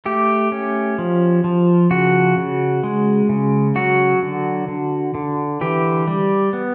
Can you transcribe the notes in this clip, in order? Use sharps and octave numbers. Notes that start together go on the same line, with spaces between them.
A3 G4
C#4
F3
F3
C#3 F#4
C#3
G#3
C#3
F#3 F#4
D3
D3
D3
E3 G4
G3
B3